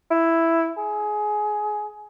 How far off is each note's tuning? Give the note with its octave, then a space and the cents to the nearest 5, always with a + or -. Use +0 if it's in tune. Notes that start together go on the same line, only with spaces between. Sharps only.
E4 +5
G#4 +20